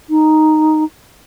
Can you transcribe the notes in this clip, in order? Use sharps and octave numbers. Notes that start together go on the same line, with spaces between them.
D#4